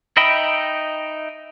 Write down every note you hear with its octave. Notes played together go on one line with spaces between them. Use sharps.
D#4 D#5 E5 G5 B5